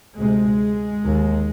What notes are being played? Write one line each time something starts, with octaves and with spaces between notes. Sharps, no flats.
D2 C3 G#3
D#2